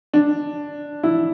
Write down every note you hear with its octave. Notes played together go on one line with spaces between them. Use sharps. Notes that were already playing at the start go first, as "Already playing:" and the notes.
D4
E4